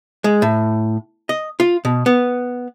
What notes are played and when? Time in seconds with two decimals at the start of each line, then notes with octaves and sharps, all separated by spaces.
0.24 G#3
0.42 A2
1.29 D#5
1.60 F4
1.85 B2
2.06 B3